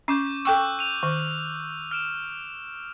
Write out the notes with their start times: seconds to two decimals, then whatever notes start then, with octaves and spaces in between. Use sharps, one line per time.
0.08 C#4 C#6 D6 G6
0.45 A4 G5 C#6 E6 F#6 G6
0.79 D#7 F7
1.03 D#3 F6
1.91 F6 D7 E7